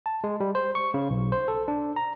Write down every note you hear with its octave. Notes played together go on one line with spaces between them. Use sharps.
A5
G#3
G3
C5
C#6
C#3
B1
C5
A4
D4
A#5